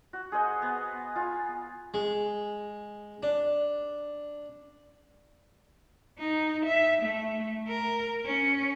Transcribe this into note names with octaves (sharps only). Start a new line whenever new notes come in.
F#4
G#4 C5 D#5 F#5
B3
F4 G#5
G#3
D4
D#4
E5
A3
A#4
C#4